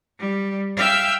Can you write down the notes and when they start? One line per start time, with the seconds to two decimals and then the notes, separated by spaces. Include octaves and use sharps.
0.19 G3
0.76 E5 F5 G5 E6